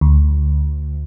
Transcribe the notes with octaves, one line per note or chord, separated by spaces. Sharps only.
D2